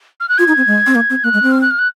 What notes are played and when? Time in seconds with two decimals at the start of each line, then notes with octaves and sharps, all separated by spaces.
0.20 F6
0.29 F#6
0.38 F4 G#6
0.48 D#4
0.57 C4
0.67 G#3
0.87 C4
0.95 A#3
1.10 C4
1.24 A#3 F#6
1.33 G#3
1.43 C4
1.52 F6
1.62 F#6
1.71 F6
1.79 F#6